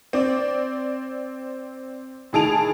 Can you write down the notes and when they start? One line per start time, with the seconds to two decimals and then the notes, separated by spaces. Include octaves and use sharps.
0.13 C4 D5
2.33 A2 D#3 G#4 A5 D7 F7